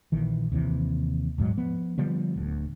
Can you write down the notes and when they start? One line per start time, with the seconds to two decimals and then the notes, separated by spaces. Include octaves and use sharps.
0.12 A#1 D#3 E3
0.52 D#2 C3 E3
1.38 D#1 G#2 F#3 G#3
1.57 F3 B3
1.98 D3 F3 G3 B3
2.36 D1 D2